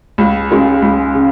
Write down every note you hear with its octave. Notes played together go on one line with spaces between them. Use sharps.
C#2
C#3 G#3
C#2
C#3